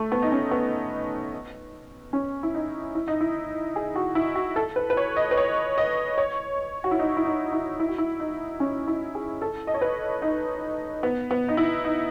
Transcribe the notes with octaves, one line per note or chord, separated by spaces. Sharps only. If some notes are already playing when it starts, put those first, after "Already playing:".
Already playing: A3
B3
D#4
C#4
B3
C#4
E4
D#4
E4
D#4
E4
G#4
F#4
E4
F#4
A4
B4
B4
C#5
D#5
B4
C#5
D#5
C#5
F#4
E4
D#4
E4
D#4
E4
E4
F#4
E4
D#4
C#4
E4
G#4
A4
D#5
C#5
B4
D#4
B3
B3
D#4
E4
D#4